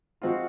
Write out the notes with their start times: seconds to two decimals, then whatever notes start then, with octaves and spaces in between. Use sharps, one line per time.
0.22 F3 G#3 C4 F4 F#4